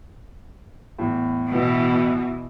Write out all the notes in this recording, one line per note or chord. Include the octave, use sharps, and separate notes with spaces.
E2 A2
B2 E3